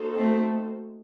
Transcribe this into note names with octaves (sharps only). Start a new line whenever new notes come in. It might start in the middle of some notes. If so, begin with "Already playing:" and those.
Already playing: A#3 D#4 F#4 A4 C5
A3 C4